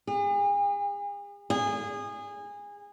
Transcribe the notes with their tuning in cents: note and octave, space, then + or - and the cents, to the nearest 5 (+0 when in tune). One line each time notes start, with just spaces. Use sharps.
G#4 -40
G#4 -25